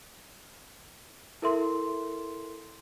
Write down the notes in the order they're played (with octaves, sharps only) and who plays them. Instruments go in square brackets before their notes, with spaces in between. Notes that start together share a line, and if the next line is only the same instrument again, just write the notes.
[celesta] E4 A4 A#4 E5 C6